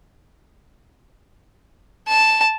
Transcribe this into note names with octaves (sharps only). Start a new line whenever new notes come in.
A5